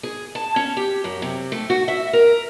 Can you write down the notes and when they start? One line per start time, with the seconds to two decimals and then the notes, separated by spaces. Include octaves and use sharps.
0.03 G#4
0.35 A5
0.56 C#4
0.77 G4
1.04 F#2
1.22 C3
1.52 A3
1.70 F#4
1.88 E5
2.13 A#4